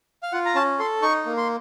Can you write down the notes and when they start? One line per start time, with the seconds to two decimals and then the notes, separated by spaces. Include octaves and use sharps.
0.23 F5
0.32 F4 F#5
0.46 A#5
0.55 C#4 A5
0.79 A4 C6
1.02 D#4 C#6
1.26 A#3
1.37 C6